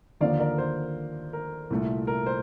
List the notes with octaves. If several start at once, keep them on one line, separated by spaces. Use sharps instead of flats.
D#2 D3 F3 A#3 D5 F5
A#4 D5
C5
A#4
C2 A#2 A3
A#4
C5